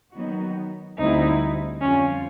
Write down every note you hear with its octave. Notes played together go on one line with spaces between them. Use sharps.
D#3 F#3 B3 D#4 F#4
D2 D3 G3 C4 D#4 E4
F2 D3 G3 C4 C#4 F4